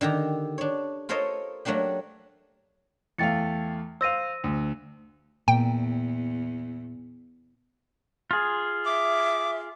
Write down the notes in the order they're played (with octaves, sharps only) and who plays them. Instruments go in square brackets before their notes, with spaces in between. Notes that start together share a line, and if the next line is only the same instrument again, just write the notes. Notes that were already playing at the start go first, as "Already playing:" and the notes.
[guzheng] D3 D#3 G4 A#5
D4 C#5
F4 A4 A#4 C5 C#5 D#5
F#3 A3 A#3 D4 G4
[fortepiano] E2 A3 F5 [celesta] G5 A6 C#7
[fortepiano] C5 F5 [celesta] E6 A#6 D#7
[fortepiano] D2
[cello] E2 [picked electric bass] A#2 [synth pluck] G5
[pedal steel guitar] F4 G#4
[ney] E5 [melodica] D6